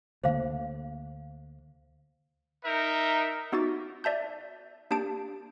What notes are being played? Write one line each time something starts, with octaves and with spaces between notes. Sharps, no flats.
D2 D3 A#3 C5 F5
D#4 A#4 E5
B3 D#4 F#4 D6 A6
D5 E5 A5 G6
A#3 D4 G4 A5 D7